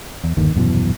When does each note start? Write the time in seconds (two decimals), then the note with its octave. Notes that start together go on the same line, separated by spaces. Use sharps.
0.24 E2
0.37 G1 D#2 D#3
0.54 D#1 F#2 B2 E3